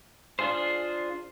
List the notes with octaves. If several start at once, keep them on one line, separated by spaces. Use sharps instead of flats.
D4 F4 G#4 C5